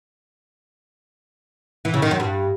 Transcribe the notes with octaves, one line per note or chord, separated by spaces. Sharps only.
E3
C#3
D#3
F#2
G2